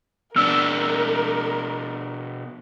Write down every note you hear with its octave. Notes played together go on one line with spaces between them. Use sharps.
B2 D4 A#4 E6